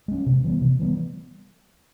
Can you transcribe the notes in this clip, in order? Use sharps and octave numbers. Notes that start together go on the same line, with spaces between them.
G#3 C#4
C3
E3 G3 B3
C3
E3 G3 B3